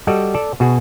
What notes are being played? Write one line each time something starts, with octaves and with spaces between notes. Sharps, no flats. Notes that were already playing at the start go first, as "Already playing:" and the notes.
G3 F#4 A4 D5 D#5
A4 D5
B2 F#4 G#4